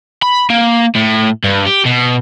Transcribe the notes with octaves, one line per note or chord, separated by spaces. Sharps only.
B5
A#3
A2
G2
G4
B2